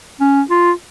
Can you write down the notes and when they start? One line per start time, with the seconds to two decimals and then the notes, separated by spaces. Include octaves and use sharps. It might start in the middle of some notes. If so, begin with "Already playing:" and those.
0.20 C#4
0.50 F4